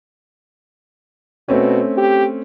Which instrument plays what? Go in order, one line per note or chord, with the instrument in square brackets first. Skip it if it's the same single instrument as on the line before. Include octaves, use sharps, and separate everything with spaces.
[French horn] B2 [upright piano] A3 C4 C#4
[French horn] G4